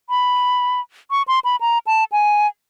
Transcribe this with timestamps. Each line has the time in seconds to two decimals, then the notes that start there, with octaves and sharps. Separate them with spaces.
0.10 B5
1.11 C#6
1.28 C6
1.44 B5
1.61 A#5
1.87 A5
2.12 G#5